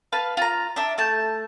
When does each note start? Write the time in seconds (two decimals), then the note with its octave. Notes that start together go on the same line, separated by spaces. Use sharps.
0.12 B4 F5 A5
0.37 F4 A#5
0.76 D4 E5
0.98 A3 A5 G6